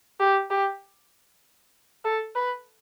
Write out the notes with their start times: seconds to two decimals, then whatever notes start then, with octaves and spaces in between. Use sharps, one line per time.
0.20 G4
0.51 G4
2.04 A4
2.35 B4